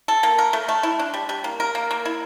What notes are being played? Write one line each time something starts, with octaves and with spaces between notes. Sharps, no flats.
A4
A#3
A#4
A3
A3
E4
D4
G3
G3
A#3
A#4
A#3
A#3
E4